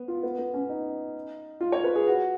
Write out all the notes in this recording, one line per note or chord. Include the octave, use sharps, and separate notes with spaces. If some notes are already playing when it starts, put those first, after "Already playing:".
Already playing: B3
F4
B3
B3
C#4
D#4
F4
C#5
B4
G#4
F#4